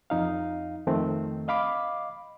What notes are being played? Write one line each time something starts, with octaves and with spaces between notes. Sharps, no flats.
F2 D#4 F5
F2 D#3 A3 C4
D#5 F5 B5 D6